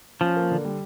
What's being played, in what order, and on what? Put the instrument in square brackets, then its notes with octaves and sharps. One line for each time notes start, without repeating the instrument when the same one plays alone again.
[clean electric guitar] F3 [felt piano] C#4
[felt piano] A#3
D3
G3